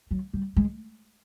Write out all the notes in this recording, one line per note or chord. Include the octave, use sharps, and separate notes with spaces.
F#3
G3
G#3